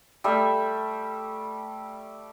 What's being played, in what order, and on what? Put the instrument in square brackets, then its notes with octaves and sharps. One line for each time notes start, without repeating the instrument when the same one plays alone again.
[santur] G3 A3 E5